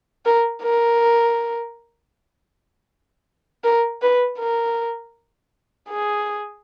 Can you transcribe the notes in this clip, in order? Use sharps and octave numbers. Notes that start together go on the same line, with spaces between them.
A#4
A#4
A#4
B4
A#4
G#4